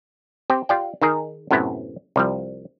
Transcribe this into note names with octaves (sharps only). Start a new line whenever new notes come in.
C4 G4 C5
F4 G4 D5 G5
D#3 D#4 G#4 A#4
F#2 A2 C3 B3 E4
C2 F3 G3